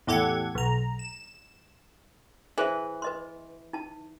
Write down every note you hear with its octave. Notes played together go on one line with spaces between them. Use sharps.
E2 A2 G4 A4 F#5 G#6
B1 A#5
E7
E3 G#4 C5 E5
B4 D#5 C6
D#4 A5